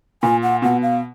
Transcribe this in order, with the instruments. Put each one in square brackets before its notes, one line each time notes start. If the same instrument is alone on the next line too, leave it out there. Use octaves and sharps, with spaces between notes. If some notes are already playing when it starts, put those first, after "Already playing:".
[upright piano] A#2 [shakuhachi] G#5
[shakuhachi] F#5
[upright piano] B2 [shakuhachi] F#5
[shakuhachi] F5